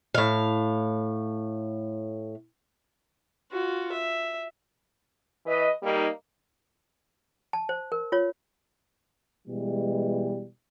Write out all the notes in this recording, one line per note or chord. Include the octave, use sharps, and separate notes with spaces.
A2 F5
F4 F#4
E5
E3 B4 D#5
G3 A#3 D#4
A5
C5
A#4
F4 C#5
B2 E3 G3 G#3